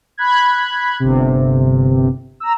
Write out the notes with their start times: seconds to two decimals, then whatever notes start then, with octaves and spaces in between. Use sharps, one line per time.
0.18 B5 F#6 G#6
1.00 G1 C3
2.40 A#5 E6